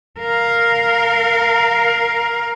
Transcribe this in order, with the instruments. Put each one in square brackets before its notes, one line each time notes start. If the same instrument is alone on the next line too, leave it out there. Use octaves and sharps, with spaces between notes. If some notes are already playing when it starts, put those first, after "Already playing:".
[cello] A#4 F5